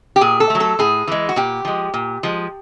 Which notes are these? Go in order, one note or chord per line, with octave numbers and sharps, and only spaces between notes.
G4
A#2 G#4
A4
F#3 A3
A4
A2 G#4
E3 G#3
F#4
A#2 G4
F3 G#3
A#2
F3 G#3